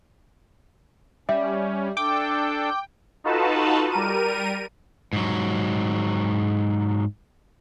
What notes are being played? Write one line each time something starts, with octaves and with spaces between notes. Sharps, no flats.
G3 C#4 E5
D4 A4 G5 D6
D#4 F4 F#4 A4 B4 A5
G3 A#4 D#7
G#2 F#3